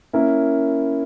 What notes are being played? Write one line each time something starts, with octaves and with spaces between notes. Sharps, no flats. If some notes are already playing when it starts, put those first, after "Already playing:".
A#3 C#4 E4 A#4